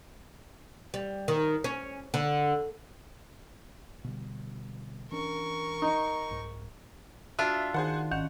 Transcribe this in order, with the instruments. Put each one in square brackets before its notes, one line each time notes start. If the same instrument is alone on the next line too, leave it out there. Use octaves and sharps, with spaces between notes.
[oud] G3
D#3
C#4
D3
[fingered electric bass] B2 D3 G3
[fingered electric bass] E3 C#4 D4 [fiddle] A#4 C#6
[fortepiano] D#4
[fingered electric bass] C2 G#2
[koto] D4 F4 [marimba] F#4 [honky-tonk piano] E5
[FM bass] D#3 [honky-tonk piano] G#4 C5 F#5
[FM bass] G#1 [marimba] D#3 C#4 [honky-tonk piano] F#5